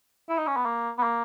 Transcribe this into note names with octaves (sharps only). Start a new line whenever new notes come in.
E4
D#4
C#4
B3
A#3
B3
A#3